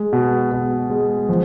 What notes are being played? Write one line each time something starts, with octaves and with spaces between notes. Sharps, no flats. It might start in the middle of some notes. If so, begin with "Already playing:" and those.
Already playing: G#3
B2
B2
G#3
F3